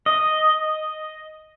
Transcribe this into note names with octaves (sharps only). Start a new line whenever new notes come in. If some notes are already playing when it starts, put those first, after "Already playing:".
D#5